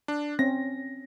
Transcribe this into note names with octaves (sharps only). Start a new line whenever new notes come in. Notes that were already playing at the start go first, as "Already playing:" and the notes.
D4
C4 C#4 A#6